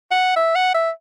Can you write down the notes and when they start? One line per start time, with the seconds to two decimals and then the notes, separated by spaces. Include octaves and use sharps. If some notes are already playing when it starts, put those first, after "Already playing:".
0.11 F#5
0.36 E5
0.55 F#5
0.74 E5